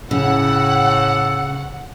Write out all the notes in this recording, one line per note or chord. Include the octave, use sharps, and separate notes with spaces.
A2 C#3 F#5 E6